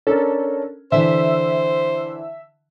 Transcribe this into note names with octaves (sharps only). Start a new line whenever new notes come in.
C#4 D4 A4 A#4
D3 E3 C5 E5 E6